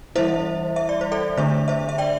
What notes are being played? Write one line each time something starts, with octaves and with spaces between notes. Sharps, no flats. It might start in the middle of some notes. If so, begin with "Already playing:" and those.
E3 G3 E4 C5 E5
E5
D5
C5
A4 D5
D3 A3 D4 C5 E5
C5 E5
E5
D5 G5